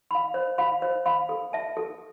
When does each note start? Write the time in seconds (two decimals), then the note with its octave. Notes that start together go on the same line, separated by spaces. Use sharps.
0.11 F5 B5
0.34 C5
0.58 F5 B5
0.82 C5
1.06 F5 B5
1.29 A4
1.53 E5 A5
1.77 A4